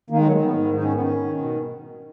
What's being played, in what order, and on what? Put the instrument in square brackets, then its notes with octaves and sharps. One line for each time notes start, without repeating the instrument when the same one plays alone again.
[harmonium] D#3 A#3
G#3
F#3
D#3 G#3
B3
G#2
D#3 D#4
C#4
D#3 B3
C#4
D#3
B2